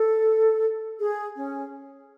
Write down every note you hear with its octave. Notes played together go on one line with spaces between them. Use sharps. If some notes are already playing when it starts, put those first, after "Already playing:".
Already playing: A4
G#4
C#4